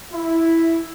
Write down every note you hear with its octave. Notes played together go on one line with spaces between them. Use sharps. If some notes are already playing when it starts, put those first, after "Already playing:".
E4